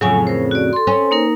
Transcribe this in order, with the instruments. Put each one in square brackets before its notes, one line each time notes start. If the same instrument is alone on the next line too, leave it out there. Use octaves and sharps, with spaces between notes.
[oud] F2 A2 C#3 [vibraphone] F#3 G#5
[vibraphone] A#4 C5
F#4 D5
A4 C6
[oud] C4 C#4
[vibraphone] A#3 D#4 A#4